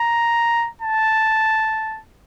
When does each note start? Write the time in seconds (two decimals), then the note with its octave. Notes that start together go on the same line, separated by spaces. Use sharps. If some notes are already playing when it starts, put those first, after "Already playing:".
Already playing: A#5
0.82 A5